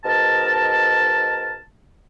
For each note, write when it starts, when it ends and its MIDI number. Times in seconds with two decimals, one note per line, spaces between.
0.04 1.58 44
0.04 1.58 47
0.04 1.58 70
0.04 1.58 81